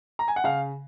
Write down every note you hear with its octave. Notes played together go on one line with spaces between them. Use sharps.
A#5
G#5
F#5
C#3 F5